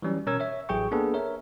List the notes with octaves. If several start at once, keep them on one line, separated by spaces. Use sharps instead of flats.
E3 F#3 G3 C#4
B2 C#4 A#4 C#5 E6 G#6
C#5 E5
A1 F#3 G#4 G5 C#6
A#3 B3 D4 G#4 A4 B4
A#4 C#5 E5